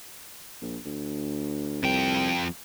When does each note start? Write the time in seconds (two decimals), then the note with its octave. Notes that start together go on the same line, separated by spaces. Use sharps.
0.61 A#1
0.85 D2
1.83 C2 F2 G5